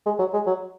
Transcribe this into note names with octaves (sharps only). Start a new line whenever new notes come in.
G#3
F#3
G#3
F#3